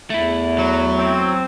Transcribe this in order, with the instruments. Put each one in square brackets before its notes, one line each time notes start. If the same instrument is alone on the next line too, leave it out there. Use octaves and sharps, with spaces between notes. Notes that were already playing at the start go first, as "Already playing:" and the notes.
[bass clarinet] E2 [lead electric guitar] A3 E4
[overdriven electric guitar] F#3
[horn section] C4